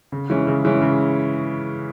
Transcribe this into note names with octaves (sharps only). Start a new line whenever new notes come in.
C#3
E3 G#3 C#4
C#3
E3 G#3 C#4
C#3